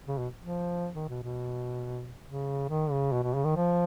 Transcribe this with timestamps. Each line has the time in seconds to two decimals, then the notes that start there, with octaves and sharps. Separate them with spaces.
0.07 C#3
0.18 B2
0.40 F3
0.94 D#3
1.08 B2
1.23 B2
2.25 C#3
2.69 D#3
2.91 C#3
3.12 B2
3.23 B2
3.34 C#3
3.44 D#3
3.56 F3